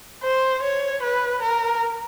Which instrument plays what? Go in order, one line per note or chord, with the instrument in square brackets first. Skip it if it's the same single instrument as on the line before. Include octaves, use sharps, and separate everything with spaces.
[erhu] C5
C#5
B4
A#4